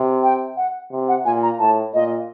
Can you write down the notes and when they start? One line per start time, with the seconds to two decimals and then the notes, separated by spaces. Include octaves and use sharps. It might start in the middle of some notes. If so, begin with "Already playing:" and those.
Already playing: C3
0.23 G5
0.57 F#5
0.92 C3
1.08 F#5
1.25 A#2 G#5
1.43 A#5
1.59 A2 A5
1.94 A#2 D#5